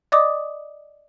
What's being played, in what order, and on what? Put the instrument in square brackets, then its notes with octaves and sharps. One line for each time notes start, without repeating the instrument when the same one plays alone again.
[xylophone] D5 D#5 D6 D#6